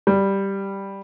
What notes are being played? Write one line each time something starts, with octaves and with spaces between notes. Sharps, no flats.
G3